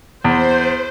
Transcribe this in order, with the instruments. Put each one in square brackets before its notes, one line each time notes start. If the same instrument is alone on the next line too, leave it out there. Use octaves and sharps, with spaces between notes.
[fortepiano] E2 [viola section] C5